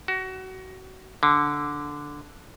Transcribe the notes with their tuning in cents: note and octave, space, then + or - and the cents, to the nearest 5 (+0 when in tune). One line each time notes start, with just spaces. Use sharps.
F#4 +25
D3 -5